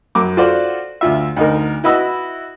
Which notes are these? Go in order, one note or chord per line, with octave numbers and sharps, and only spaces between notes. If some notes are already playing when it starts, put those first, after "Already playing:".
F#2 D6
F4 F#4 A4 C5 D5 F#5
D2 F4 E5
D2 D#4 A#4
E4 F#4 B4 D#5 B5 E6